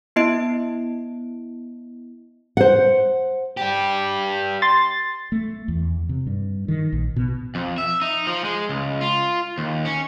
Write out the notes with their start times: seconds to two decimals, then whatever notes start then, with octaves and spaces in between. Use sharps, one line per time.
0.16 B3 E4 D#5 D7
2.57 C5 F#5
3.57 D4 G4
4.62 C6 A6
5.32 A3
5.68 E2
6.09 C3
6.27 G2
6.68 D#3
6.92 A#1
7.16 B2
7.55 F2
7.78 E5
8.02 D#4
8.27 F3
8.44 G#3
8.69 C#2
9.01 F4
9.58 D#2
9.85 C#4